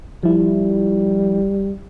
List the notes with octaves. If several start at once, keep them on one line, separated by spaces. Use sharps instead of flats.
F3 G3 E4